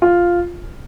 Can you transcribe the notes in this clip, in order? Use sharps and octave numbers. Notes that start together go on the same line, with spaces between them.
F4